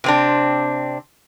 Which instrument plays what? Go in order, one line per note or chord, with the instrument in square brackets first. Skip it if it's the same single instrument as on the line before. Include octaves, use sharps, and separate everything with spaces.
[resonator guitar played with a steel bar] C3 C4 D4